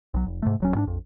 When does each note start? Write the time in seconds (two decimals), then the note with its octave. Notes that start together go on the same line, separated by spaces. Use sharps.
0.14 B1 F#3
0.26 F1
0.42 G#2 C3 A3
0.60 D#1 F#3 C#4
0.75 G#2 C#4 D4
0.87 A#1 F2